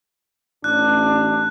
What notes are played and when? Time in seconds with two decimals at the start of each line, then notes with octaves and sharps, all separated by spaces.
0.64 A1 D4 F#6